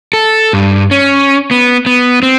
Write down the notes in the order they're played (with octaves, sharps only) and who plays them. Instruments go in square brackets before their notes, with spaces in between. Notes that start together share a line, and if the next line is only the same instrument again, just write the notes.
[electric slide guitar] A4
G2
C#4
B3
B3
C4